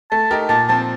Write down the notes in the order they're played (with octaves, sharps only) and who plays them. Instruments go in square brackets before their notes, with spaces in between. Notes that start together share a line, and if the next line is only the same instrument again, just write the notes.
[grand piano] A3 [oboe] A5
[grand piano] D#4 G4 A#4
[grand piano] A#2 [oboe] A5
[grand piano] F3 C4 [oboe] A5